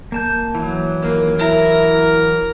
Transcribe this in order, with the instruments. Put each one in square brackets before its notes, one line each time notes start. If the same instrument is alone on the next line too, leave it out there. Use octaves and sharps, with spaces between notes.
[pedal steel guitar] A#3 A5 G6
E3 F#3
[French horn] D#2 [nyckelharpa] A#3
[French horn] E4 [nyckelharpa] A#4 A#5